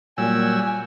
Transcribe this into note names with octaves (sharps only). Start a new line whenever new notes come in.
A#2 F#3 G3 G#5 E6